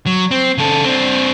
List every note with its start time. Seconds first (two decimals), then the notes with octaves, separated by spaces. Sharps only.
0.06 F#3
0.31 C4
0.58 C#3 A4
0.85 C4 D4